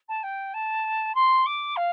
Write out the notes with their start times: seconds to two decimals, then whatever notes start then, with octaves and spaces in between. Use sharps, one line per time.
0.08 A5
0.23 G5
0.54 A5
1.15 C6
1.46 D6
1.76 F5